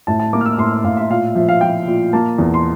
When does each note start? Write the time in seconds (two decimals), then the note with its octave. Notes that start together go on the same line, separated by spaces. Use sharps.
0.07 A2 A5
0.20 A5
0.33 A#3 D6
0.41 F6
0.46 E6
0.58 A2 C6
0.84 A2 F5
0.97 E5
1.10 A#2 F5
1.35 F3 E5
1.49 F5
1.61 F3 G5
1.87 A#2
2.13 A#3 A5
2.38 E2
2.54 C6